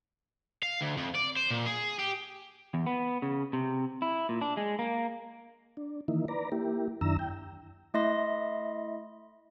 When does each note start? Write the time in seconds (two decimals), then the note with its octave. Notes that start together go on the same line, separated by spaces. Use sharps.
0.63 F5
0.81 D2
0.98 F2
1.15 D5
1.37 C5
1.51 A#2
1.66 G#4
1.99 G4
2.74 E2
2.86 B3
3.22 C#3
3.53 C3
4.02 E4
4.29 A#2
4.41 D4
4.57 G#3
4.79 A#3
5.77 D4
6.08 D#3 E3 A#3 D#4 E4
6.28 B4 D5 A#5
6.52 A#3 E4 G4
7.01 F#2 D#3 D4 E4 A#5 E6
7.19 G5
7.94 A3 E4 D#5 E5 C6 A#6